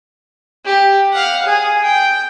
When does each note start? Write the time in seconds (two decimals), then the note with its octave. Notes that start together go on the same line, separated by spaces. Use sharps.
0.65 G4
1.12 F5 F#5
1.45 G#4
1.83 G5